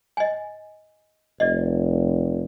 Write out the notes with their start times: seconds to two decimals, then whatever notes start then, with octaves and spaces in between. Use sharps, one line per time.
0.17 D#5 G#5
1.40 F1 D5 D#5